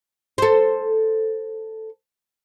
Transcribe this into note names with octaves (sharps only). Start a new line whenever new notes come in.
A4 C5